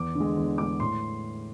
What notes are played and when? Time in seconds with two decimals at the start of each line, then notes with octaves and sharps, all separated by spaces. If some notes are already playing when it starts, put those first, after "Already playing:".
Already playing: E2 D6
0.15 D3
0.20 G#3
0.37 E2
0.58 D3 G#3 D6
0.80 A2 C6